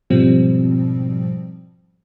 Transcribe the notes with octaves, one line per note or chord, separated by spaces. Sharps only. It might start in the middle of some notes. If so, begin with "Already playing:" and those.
G#2 B2 F3 G3 C4